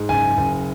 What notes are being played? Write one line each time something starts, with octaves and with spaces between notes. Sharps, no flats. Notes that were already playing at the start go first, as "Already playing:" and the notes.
Already playing: G#2
F#1 G#5
F#1